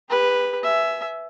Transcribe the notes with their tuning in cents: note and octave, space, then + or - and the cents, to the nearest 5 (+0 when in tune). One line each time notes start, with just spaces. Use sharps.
G4 +35 B4 +0
E5 +5 G#5 +30